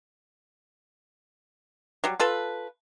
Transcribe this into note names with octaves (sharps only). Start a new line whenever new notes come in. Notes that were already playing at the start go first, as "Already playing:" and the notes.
F#3 G3
F4 A4 B4